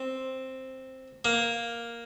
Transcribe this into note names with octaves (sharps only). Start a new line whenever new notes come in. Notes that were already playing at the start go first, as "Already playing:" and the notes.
Already playing: C4
A#3